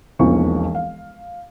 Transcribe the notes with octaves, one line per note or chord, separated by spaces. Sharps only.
E1 B1 F2 F3 A#3 C#6
F5